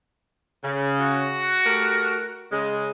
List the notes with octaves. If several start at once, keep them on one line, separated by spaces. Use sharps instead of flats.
C#3
F#4
A3 G4 A#4
C#3 G#3